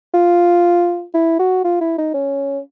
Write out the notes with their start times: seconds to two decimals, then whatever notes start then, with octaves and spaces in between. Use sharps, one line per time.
0.14 F4
1.14 E4
1.39 F#4
1.64 F4
1.81 E4
1.98 D#4
2.14 C#4